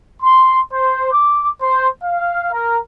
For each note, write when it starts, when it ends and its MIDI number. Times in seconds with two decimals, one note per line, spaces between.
0.22 0.60 84
0.72 1.08 72
1.12 1.49 86
1.61 1.87 72
2.02 2.51 77
2.52 2.78 70